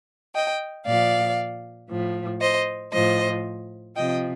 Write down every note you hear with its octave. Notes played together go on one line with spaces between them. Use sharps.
D#5 G5
A#2 F3 D5 F5
A2 F3
C5 D#5
A2 F3 C5 D#5
C3 F3 D#5 G5